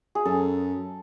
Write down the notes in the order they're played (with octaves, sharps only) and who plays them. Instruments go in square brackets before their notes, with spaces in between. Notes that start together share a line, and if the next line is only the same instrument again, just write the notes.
[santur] G#4
[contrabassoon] F#2 [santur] A4